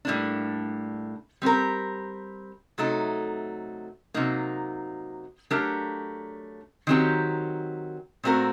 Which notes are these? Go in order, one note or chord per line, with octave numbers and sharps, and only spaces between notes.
A2 G3 A#3 D4
G3 C4 G4 A#4
C3 F#3 A3 D#4 A4
C3 F#3 A#3 D#4
F#3 A3 D4 G4 A#4
D#3 F#3 C4 G4 A#4
A#2 A3 C4 F#4 A#4